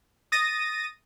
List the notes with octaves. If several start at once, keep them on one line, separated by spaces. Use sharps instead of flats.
D#6 A6 A#6 D#7